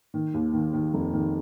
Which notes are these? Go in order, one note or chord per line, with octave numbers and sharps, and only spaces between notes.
D#3
D#2
D#3
D#3
F1
D#3